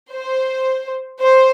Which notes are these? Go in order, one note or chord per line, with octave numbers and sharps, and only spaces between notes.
C5
C5